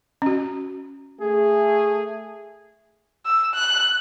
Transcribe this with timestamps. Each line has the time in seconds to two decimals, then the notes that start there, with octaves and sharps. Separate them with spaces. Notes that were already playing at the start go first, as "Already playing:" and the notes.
0.22 C#4 F#4
1.21 A3 G#4
3.26 E6
3.54 F#6